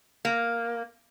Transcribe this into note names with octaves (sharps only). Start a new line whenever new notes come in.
A#3